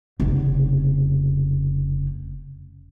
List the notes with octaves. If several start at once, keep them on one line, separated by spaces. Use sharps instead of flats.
F1 C#3